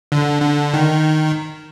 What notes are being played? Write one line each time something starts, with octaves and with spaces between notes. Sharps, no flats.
D3
D3
D#3